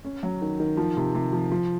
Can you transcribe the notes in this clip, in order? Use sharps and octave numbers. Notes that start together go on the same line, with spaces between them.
C#4
F#3
D#3
D#3
F3
C3
C3
F3
F3